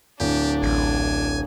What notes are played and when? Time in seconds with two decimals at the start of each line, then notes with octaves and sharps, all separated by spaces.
0.20 D1 D4 G4
0.63 A1 G#5